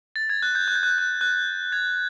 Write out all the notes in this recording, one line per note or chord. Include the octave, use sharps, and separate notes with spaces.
A6
G#6
F#6
G6
F#6
G6
F#6
G6
F#6
F#6
G#6